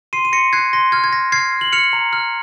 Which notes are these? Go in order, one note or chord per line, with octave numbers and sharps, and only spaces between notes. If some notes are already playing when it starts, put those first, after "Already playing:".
C6 C7 D#7
D#7
C6 A#6 C#7
F#6 G#6 C7
C6 A#6
F6 G#6
G#6
C6 A#6
F6 G#6 C7
F6
F#7
F6 C#7 F7
A#5
F6